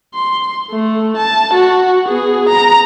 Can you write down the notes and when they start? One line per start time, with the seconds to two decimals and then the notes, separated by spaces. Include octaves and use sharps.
0.15 C6
0.72 A3
1.17 A5
1.54 F#4
2.08 B3 G#4
2.49 A#5